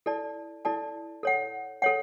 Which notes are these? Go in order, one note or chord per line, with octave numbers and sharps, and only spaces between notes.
E4 A4 D5 A5
E4 A4 D5 A5
A4 C#5 F#5
A4 C#5 F#5